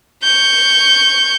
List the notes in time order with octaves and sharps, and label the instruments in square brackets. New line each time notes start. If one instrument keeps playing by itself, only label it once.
[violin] C#6 G6